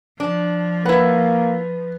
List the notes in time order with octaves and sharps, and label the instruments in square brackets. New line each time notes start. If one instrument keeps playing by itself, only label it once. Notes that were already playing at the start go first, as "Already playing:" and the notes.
[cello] F3 [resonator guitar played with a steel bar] D4
[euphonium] A#3 [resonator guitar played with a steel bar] E4 F#5 [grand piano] B4